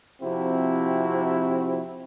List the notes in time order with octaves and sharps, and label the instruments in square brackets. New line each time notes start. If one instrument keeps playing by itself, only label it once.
[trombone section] C3 F3 C4 E4 F#4